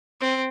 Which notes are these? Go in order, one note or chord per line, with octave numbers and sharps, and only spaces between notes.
C4